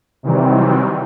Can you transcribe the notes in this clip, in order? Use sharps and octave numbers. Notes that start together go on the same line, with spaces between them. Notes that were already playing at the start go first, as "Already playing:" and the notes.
C3 D#3 E3 F#3 G3 C4